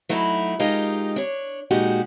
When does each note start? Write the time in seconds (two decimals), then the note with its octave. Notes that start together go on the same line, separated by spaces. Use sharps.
0.09 F#3 A3 D#4 E4
0.60 G#3 D#4 F4 G4 A#4 D#5
1.16 D4 C#5
1.71 A#2 G#3 D#4 F#4 G4